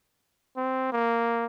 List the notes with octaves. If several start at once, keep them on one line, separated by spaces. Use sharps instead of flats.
C4
A#3